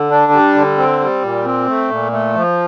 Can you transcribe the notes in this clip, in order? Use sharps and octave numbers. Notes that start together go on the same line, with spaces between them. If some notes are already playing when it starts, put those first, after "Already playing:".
Already playing: D3
D4
G3
D3
C4
G3
A#2
C4
A3
A#2
A3
F3